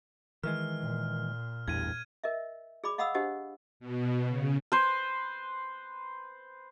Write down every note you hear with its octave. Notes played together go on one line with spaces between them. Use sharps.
D#3 E3 G#3 F6
A#2
A1 E2 G2 G#6 D#7
A#4 D#5 E5
G#4 D5 B5 D6
D#5 F5 F#5 B5 D#6 E6
D4 G4 C5 D#5 F#5
B2
C#3
B4 C5